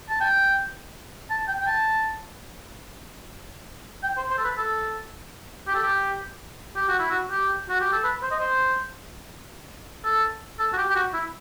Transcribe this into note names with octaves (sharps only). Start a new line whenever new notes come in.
A5
G5
A5
G5
G5
A5
G5
C5
C5
A4
B4
A4
G4
A4
G4
G4
F#4
E4
F#4
G4
F#4
G4
A4
B4
C5
D#5
C5
A4
A4
F#4
G4
G4
F#4
E4